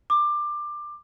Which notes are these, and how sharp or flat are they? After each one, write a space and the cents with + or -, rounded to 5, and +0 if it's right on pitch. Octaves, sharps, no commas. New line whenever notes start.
D6 +20